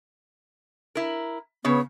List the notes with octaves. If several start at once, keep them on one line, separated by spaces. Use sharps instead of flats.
E4 A#4
C#3 B3 C#5